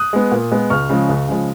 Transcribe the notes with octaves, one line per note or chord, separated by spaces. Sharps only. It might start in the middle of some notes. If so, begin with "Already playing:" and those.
Already playing: D#6 F#6
G#3 B3
A#2
G#3 B3
C#2 C#6 F6
C#3 F3 G#3
C#2
C#3 F3 G#3